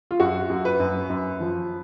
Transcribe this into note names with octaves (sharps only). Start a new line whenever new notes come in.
F4
F#2 F#4
F#2
B4
F#2
F#2
F3